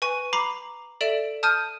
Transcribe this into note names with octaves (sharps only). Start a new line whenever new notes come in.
B4 G#5 C#6 D#7
A#5 B5 D6 C7
A4 D5 E5 D7 E7
A5 D#6 F6 G6 D#7